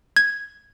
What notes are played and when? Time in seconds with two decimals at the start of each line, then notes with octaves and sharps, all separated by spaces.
0.17 G#6